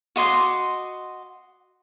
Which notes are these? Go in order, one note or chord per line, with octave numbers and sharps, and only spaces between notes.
F#4 D#5 C6 D6